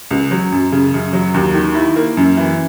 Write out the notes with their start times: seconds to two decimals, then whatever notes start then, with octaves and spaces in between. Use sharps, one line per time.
0.11 C#2
0.31 F#3
0.52 F#2
0.72 C#3
0.94 F#2
1.13 F#3
1.34 D#2
1.54 D#3
1.75 E4
1.96 A#3
2.17 F#2
2.37 E3